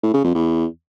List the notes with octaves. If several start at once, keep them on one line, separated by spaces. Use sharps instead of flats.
A2
C#3
F2
E2